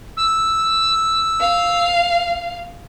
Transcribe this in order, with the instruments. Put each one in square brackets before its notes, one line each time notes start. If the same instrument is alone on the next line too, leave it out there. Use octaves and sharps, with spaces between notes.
[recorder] E6
[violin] F5